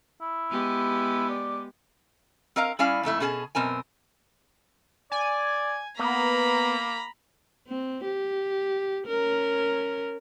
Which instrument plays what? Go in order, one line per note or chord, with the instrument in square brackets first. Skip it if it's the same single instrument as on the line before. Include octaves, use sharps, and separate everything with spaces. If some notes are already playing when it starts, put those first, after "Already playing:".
[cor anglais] E4
[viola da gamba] G#3 B3 G4
[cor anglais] D5
[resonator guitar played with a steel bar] C4 A#4 D#5 F5 A#5
G3 C#4 E4 D5 F5 G#5
F2 G#2 A3 E4
B2 C#4 G#4 G#5 A5
F#2 B2 C4 A#4 G#5
[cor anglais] D5 [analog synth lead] G#5
[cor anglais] A#3 [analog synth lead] B3 [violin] A#5 B5
[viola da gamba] C4
G4
C#4 A#4